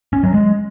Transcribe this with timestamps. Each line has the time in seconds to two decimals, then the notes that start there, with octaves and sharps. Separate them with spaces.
0.13 C#4
0.23 F#3
0.34 G#3